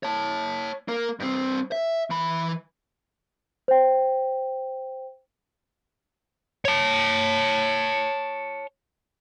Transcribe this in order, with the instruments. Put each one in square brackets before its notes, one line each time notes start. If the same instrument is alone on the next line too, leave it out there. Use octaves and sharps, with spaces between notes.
[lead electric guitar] C#5 A5
A#3 A#4
G2 C4
E5
E3 B5
[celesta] C5 G5
[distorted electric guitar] C#5 A5